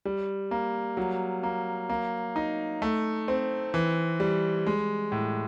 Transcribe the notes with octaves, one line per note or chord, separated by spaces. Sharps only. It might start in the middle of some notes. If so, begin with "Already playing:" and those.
G3
A#3
F#3
A#3
A#3
D#4
A3
C4
E3
G3
G#3
A2